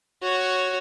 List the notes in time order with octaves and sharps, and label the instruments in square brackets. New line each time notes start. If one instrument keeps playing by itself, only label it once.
[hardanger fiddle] F#4 C#5